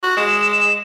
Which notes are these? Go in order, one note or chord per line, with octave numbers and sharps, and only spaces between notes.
F#4
G#3 E7